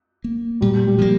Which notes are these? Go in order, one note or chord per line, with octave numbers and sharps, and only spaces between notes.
A#3
A#2 G3
G3
F3 A#3